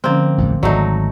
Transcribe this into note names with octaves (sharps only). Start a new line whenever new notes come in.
D3 F3 A#3 C4 C#4
A1 E2 G2
G#1 F#3 A3 D#4 D5